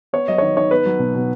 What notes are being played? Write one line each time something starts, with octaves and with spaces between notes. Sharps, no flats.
B3 C#5
F#3 D#5
C#5
D#3 D#5
D#3 C#5
B3 B4
F#3
B2
B2